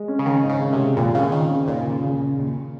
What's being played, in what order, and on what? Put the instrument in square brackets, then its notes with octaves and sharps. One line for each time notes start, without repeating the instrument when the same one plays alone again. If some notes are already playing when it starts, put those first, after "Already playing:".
Already playing: [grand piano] G#3
C#4
[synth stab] C#3
[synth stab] D#3 [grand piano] C#4
[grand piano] G#2
[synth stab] C#3
[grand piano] C#4
[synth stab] C3
[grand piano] G#3
[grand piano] D#2 [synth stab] A#2
[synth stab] C#3 [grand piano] C4
[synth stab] D#3 [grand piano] C4
[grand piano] C#3
[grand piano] D#2 [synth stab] A#2
[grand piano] C#3
C#3
C#3
D#2